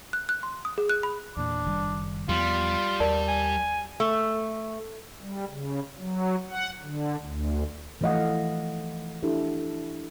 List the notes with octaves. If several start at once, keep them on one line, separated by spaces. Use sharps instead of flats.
F#6
F#6
C6
D#6
G#4
F#6
B5
E2 A#2 D4
F#1 D#3 G3
E2 F3 G3 B3 F4
D#2 A#4 D5 A5
G#5
A3
G3
C#3
F#3
F#5
D3
D2
E3 F3 A3 D#5 F5 F#5
D4 E4 G4 A4